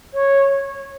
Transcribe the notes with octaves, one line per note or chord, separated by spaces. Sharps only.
C#5